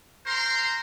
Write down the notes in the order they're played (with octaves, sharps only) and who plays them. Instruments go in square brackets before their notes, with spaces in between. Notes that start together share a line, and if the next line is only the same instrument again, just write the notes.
[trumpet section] A#4 C5 A#5 C6